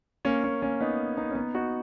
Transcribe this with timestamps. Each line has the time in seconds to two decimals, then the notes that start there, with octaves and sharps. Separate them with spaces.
0.25 A#3 C#4
0.44 A#3 C#4
0.62 A#3 C#4
0.80 B3 D#4
1.17 B3 D#4
1.31 C#4
1.35 B3 D#4
1.55 D#4 F#4